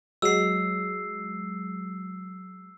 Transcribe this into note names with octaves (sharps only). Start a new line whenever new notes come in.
F#3 G#3 E6 C7